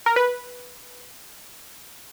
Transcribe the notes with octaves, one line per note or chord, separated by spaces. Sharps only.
A#4
B4